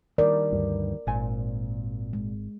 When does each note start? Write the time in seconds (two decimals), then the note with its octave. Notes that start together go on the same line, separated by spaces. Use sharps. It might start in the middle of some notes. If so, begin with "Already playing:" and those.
0.18 D#3 G3 A#4 D5
0.52 D2 G2
1.07 G#1 A#2 G#5
2.13 G#3